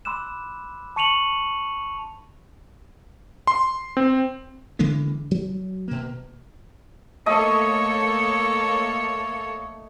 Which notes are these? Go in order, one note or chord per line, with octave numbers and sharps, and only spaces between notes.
B5 C6 D6 E6 F#6 E7
A5 C#6 C#7 D#7 F7 F#7
C6
C4
C#3 E3 G#3 A#3
F#3
B2 A#3
A3 A#3 A4 C#5 D#5